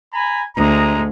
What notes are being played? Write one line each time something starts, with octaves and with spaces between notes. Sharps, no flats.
G#5 A#5 B5
D2 G#3 D#5 A#5